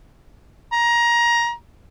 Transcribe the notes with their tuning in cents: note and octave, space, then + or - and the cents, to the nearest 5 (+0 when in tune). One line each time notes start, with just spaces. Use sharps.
A#5 +20